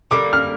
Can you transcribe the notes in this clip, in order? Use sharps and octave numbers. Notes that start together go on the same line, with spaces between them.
D3 G3 A#3 D6
F6